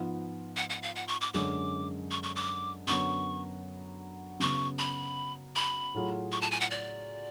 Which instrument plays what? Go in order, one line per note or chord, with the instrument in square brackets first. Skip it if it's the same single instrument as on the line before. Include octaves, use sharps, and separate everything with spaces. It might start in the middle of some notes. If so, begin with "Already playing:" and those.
Already playing: [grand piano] G#2 F3 B3 F4
[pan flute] F#5
F#5
F5
F#5
C#6
D6
[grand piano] F#2 D3 G#3 C#4 [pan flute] D6
[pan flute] C#6
C#6
D6
[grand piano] F#2 D3 F#3 B3 [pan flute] C#6
[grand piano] C#3 F#3 B3 [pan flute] C#6
[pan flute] B5
B5
[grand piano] A2 F#3 A3 F4 G#4
[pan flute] C#6
A5
G#5
F#5
D5